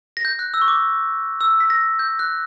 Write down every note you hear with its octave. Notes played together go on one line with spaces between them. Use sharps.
A#6
G6
F#6
E6
C#6
D6
E6
B6
A#6
G6
F#6